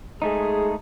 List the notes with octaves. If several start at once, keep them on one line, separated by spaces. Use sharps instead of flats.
G#3 A3 D#4 G#4